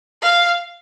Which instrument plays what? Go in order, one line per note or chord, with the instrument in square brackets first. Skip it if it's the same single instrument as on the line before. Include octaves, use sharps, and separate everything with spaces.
[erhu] F5